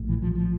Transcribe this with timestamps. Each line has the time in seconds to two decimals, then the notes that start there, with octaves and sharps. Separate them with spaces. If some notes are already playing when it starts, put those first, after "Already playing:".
Already playing: A#1 A2
0.09 E3
0.22 F3
0.35 F3